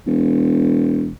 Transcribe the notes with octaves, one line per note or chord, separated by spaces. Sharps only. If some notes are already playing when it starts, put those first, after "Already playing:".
E1